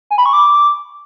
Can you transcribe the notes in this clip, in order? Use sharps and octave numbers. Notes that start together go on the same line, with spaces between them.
G#5
B5
C#6
D6